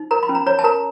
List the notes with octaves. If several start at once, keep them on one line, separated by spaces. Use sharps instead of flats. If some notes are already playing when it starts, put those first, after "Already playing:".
Already playing: D#4
A#4 A#5
B5
C#4
A#5
C#5 A#5
A5
A#4 A#5